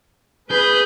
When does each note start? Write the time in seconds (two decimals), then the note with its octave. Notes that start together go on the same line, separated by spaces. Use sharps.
0.51 G#4 B4 G6